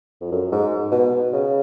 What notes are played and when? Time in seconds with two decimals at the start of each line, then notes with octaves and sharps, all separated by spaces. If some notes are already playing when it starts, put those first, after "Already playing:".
0.21 F2
0.31 F#2
0.52 G#2
0.92 B2
1.33 C#3